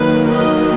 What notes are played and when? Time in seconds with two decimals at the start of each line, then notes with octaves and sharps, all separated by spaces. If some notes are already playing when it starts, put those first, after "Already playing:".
Already playing: D#3 F#3 A#3 B4
0.29 B4 D#5